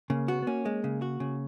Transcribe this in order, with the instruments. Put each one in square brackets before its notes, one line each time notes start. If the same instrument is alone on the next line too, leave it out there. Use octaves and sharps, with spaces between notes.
[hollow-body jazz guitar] C#3 [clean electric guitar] A#3
[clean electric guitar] B3 [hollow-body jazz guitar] F#4
[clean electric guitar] B3
[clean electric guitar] A#3 [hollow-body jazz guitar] C#4
[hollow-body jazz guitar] G#3
C#3
F#4
C#3